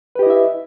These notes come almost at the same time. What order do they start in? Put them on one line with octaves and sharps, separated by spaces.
B4 G4 D#5 E4 E5